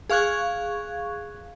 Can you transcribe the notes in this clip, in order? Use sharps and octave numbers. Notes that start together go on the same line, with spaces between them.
G#4 F5 C#6 F#6 G#6